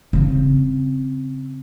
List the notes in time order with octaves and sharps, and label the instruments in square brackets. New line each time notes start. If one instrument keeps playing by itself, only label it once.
[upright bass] C#3 C4